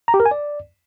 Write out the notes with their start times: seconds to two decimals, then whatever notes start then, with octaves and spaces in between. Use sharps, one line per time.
0.08 A#5
0.14 G4
0.20 A#4
0.26 G#5
0.31 D5